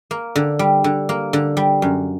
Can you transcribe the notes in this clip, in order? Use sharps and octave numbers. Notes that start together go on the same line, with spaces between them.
A#3
D3
G3
D3
A#3
D3
G3
F#2